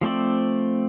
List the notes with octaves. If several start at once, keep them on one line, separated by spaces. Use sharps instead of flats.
F3 A3 C4 D5